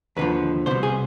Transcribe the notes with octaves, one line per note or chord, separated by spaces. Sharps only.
D#2 D3 F3 B4
C2 B2 C5
G#4